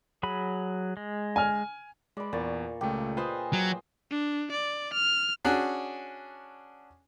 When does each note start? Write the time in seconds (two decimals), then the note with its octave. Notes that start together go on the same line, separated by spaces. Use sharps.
0.23 F#3 G#4 B5
0.97 G#3
1.36 G#5 F6
2.17 G#3 B4 D5
2.33 E2 A#2 C#6 A6
2.81 C#2 C#3 A3 G4
3.17 F4 G#4 B4 C5 D#5 G#5
3.53 F#3
4.11 D4
4.52 D5
4.94 F6
5.45 C#4 D4 F#4 G#4